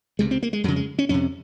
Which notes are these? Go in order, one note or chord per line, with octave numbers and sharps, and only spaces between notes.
C#2 C3 G#3
C4
A#3
G#3
F2 C#3 F#3
G#3
C#4
F2 C3 C#4